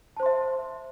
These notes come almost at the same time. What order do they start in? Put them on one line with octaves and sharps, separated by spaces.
A5 C5 C6 E5